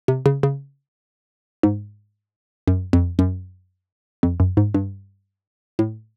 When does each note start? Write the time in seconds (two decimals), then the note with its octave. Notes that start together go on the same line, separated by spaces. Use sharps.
0.08 C3
0.26 C#3
0.43 C#3
1.63 G#2
2.68 F#2
2.93 F2
3.19 F#2
4.23 F2
4.40 F#2
4.57 G#2
4.74 G2
5.79 A2